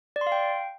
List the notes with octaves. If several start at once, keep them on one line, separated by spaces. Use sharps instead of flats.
D5
C6
F5
G5